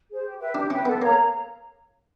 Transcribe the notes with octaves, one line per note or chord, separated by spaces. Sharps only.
G#4 C5
G4
B4 E5 G5
D4 G4
C#4 B4 E5 G5
B3 A4
A#3 C#5 F5 A#5